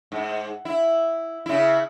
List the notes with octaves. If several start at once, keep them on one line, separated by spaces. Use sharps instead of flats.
G#2
E4
C#3 E4